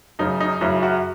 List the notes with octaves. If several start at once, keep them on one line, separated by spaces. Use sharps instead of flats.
F#2 C#3 F#3 D#4
D#4
F#2 C#3 F#3 E4
F#4